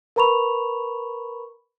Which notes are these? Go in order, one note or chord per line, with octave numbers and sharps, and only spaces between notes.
A#4 B4 A#5 B5 C#6 F7